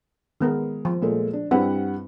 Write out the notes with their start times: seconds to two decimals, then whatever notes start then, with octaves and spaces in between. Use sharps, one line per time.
0.41 D#3 G#3 B3 A#4
0.85 F3
1.02 A#2 G#3 A3
1.33 D4
1.51 G2 G3 C4 E4 B4 F#5